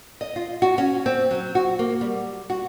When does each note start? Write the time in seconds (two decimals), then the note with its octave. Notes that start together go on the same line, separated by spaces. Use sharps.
0.21 D#5
0.36 F4
0.62 F#4
0.78 C#4
1.06 C4
1.31 F#3
1.55 F#4
1.79 A#3
2.01 G3
2.50 F#4